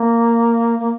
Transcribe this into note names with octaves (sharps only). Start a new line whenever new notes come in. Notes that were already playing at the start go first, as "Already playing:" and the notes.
Already playing: A#3
A#3